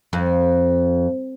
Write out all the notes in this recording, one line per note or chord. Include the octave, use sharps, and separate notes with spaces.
F2